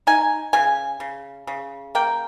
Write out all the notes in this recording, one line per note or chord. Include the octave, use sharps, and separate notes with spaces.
D#4 G#5
C#3 G#5
C#3
C#3
A#3 G5